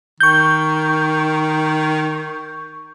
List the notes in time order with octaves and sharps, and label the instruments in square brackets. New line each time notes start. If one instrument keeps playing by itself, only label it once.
[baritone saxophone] D#3 [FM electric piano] C#6 G6